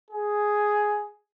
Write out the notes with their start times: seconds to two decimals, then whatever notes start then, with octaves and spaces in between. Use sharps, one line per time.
0.11 G#4